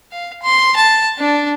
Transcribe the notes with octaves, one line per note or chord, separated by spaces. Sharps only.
F5
C6
A5
D4